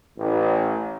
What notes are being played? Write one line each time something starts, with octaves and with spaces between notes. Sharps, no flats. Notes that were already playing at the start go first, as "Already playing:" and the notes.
A1